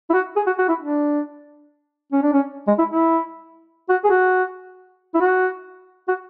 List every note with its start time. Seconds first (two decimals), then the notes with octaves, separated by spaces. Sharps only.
0.10 E4
0.14 F#4
0.36 G#4
0.47 F#4
0.59 F#4
0.69 E4
0.81 D4
2.13 C#4
2.23 D4
2.33 C#4
2.68 G#3
2.79 E4
2.90 E4
3.89 F#4
4.05 G#4
4.10 F#4
5.15 E4
5.21 F#4
6.08 F#4